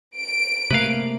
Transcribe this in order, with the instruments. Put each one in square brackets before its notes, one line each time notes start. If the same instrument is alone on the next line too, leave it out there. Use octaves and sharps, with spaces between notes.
[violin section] D7
[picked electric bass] C3 A3 A#3 [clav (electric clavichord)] B4 F5